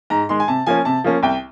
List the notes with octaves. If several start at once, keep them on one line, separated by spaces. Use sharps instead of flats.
G#2 A#5
D#3 G#3 C6
G#5
C3 A5
F3 A#3 C#4 G#5
C3 A5
F3 A#3 C#4
C2 G5